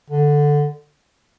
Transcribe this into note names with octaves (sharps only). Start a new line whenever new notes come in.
D3